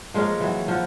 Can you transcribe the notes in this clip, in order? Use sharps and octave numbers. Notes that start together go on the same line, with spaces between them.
F3 G#3 A#3 C#4
E3 F#3
F3 F#4